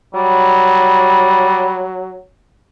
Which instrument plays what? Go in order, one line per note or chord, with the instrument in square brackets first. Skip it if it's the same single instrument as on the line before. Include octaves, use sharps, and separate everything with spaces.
[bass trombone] F#3 [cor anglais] G3